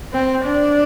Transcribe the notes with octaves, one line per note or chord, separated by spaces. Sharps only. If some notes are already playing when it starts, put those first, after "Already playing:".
C4
D4